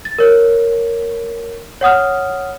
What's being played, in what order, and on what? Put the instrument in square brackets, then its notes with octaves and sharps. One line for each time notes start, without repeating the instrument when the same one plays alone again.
[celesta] A6
A#4 C#5
C#5 F#5 D#6 F6